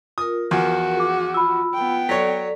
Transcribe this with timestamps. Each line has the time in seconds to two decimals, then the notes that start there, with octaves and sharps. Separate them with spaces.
0.18 F4 A#4 D#6
0.51 E2 F3 F#4
0.96 G#4 D6
1.34 F4 B5 E6
1.75 B3 G5
2.09 F#3 A4 C#5 D5 B6